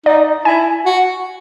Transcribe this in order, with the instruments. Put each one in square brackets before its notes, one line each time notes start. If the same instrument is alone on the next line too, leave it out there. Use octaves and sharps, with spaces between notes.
[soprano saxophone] D#4 [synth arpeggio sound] D5
[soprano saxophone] E4 [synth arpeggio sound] G#5
[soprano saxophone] F#4